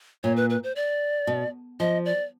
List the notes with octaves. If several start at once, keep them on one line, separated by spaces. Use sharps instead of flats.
A#2 C#5
B4
B4
C5
D5
B2
F3 D#5
D5